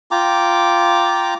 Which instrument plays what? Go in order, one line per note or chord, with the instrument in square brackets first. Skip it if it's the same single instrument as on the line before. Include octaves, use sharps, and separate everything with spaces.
[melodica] F4 G5 A#5 D6